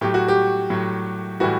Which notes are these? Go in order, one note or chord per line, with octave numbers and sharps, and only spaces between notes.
A2 F#3 G4
F#4
G4
A2 F#3
A2 E3 G3 F#4